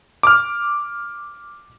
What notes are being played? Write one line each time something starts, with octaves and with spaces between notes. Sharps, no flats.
D6 F6